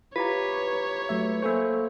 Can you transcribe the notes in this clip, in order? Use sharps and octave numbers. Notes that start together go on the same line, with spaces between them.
E4 F4 G4 B4 C#5 A#5
F#3 A3 E5
A#3 A4 C5 E5 G#5 C#6